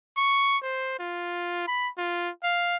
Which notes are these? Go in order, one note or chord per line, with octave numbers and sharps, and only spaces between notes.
C#6
C5
F4
B5
F4
F5